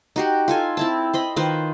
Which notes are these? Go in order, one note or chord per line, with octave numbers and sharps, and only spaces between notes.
D#4 F#4 G4
F4 A4 G#5
C4 E4 A5
C5 D#5 B5
D#3 F4 B4 C5